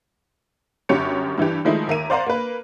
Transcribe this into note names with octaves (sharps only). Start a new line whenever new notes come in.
G1 F#2 G4 C#5 C#7
G2 E3 E4 G4
D#3 F3 G#3 A3 D#4 E4
D#2 A#4 E5 D#7
C5 D5 F5 F#5 A#5 C6
A#3 B4